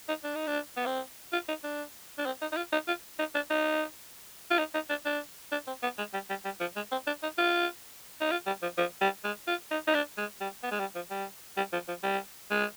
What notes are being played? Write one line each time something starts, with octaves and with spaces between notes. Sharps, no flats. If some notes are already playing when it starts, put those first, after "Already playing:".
D#4
D4
D#4
D4
B3
C4
F4
D#4
D4
D4
C4
D#4
D#4
F4
D#4
F4
D#4
D4
D#4
F4
D#4
D#4
D4
D4
D4
C4
B3
G#3
G3
G3
G3
F3
G#3
C4
D4
D#4
F4
D#4
F4
G3
F3
F3
G3
G#3
F4
D#4
D#4
D4
G#3
G3
B3
G#3
G3
F3
G3
G3
F3
F3
G3
G#3